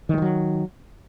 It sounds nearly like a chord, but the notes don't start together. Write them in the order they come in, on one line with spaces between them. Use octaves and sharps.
D#3 G3 E3 F#3